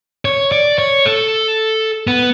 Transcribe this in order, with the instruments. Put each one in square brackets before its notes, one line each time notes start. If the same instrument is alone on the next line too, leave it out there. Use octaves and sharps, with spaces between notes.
[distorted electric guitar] C#5
D5
C#5
A4
B3